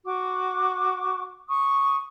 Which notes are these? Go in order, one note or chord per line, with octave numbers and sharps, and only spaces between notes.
F#4 C#6 D6
C#6 D#6